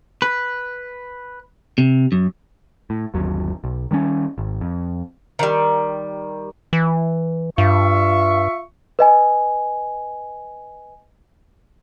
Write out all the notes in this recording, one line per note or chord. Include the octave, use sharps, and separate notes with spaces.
B4
C3
F#2
A2
G1 D#2 F#3
B1
D#3 G3 A#3 C#4
G#1
F2
D#3 F#3 G3
E3
G2 F4 E5 C#6
B4 D#5 G#5